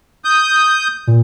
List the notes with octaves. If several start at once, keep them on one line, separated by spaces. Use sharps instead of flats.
D#6 G6
A#2